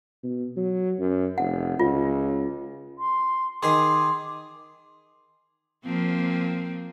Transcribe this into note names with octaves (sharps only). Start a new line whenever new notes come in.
B2
F#3
F#2
F1 F#5
C#2 F4
C6
D#3 D#4 G#4 C6 D6
F3 A#3 C4